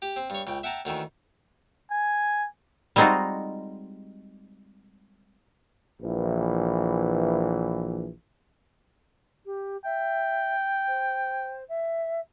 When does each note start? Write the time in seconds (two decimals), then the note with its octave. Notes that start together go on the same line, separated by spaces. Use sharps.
0.02 G4
0.16 C4
0.30 G2 C#5
0.47 C#2 G5
0.63 E5 F#5 G5 A5 A#5
0.85 D2 D#3 E3
1.91 G#5
2.96 G3 G#3 C4 D#4 F4 F#4
6.01 A#1 E3
9.46 G4
9.84 E5 G5
10.87 C5
11.69 E5